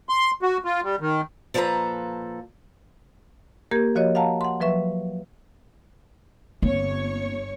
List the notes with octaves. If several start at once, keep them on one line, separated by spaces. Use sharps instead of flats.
C6
F#4
F4
G3
D#3
A#2 F3 D#4 A4 B4 A#5
A#3 G4 A#4 G#6
F3 F#4 C#5 D#5
F5 F#5 A5 A#5
F#5 C6
F3 F#3 B4 E5 C#6
G1 A#3 C4 C#5